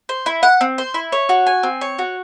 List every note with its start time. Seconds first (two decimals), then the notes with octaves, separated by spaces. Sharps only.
0.09 C5
0.26 E4
0.43 F#5
0.61 C4
0.78 C5
0.94 E4
1.12 C#5
1.29 F#4
1.47 G#5
1.63 C4
1.81 C#5
1.99 F#4